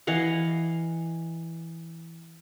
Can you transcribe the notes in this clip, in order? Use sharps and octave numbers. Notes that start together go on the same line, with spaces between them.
E3 D#5 F5 F#5